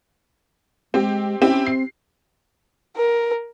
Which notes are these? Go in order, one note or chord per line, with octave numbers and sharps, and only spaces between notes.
G#3 C4 G4
C4 C#4 E4 G4
C4 C7
A#4